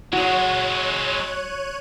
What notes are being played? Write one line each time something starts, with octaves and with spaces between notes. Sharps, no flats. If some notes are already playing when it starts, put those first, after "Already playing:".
F#3 G#3 F#4 C#5 F#6 D#7